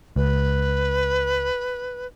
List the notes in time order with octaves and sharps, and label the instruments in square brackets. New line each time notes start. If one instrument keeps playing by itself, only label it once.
[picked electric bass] C#2 [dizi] B4